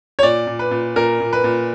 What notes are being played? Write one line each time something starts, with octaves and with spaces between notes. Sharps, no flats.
C#5
A#2 D5
A#2
B4
A#2
A#2 A#4
A#2
B4
A#2